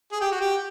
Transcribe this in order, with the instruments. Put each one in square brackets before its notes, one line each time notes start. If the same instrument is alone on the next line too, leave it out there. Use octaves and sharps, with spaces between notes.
[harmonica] G#4
G4
F#4
G4